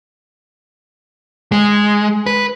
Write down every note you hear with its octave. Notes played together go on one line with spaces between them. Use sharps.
G#3
B4